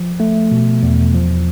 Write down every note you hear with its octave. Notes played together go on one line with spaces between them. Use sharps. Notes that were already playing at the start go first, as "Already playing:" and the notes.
Already playing: F3
A3
B2
E2
F3